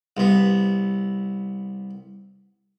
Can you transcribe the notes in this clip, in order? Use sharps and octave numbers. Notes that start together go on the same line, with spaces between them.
C2 B3